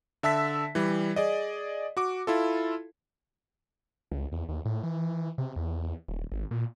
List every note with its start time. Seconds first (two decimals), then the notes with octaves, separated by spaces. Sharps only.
0.23 D3 E5 A5 E6 B6
0.75 E3 G3
1.16 G#4 D5 D#5
1.97 F#4 D6
2.27 E4 F4 A4
4.12 C#2
4.32 E2
4.49 D#2
4.65 A2
4.83 E3
5.38 C3
5.56 E2
6.08 D#1
6.32 G#1
6.51 A#2